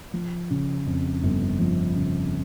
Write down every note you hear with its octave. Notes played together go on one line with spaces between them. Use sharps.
F3
C#3
F2
G1
F3
C#3